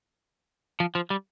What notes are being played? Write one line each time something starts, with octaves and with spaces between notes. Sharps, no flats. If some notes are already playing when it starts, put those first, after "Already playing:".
F3
F3
G3